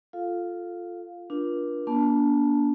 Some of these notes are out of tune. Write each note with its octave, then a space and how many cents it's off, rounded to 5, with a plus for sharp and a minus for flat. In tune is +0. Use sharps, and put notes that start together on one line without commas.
F4 +0 A4 +0 F5 +10
D4 +0 F4 +0 A#4 +45
A#3 +40 D4 -25 A5 -10